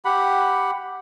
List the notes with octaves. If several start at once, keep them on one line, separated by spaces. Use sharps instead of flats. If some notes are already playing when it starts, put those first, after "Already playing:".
G4 F#5 B5